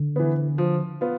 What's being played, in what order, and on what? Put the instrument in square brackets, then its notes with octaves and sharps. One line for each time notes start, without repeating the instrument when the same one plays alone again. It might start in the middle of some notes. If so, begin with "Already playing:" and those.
Already playing: [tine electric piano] D3
[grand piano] E3 B3
F3
B3 F4